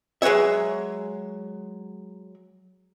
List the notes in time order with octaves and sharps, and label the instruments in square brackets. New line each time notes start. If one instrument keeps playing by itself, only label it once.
[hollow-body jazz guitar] F#3 G#3 B4 C#5 E5